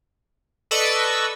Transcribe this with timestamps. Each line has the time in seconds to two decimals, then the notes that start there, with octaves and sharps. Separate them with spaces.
0.71 A4 B4 D5 D#5 C#6 E6